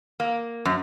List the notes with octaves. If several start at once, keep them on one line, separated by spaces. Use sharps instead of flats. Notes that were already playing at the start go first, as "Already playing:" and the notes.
A#3
F#2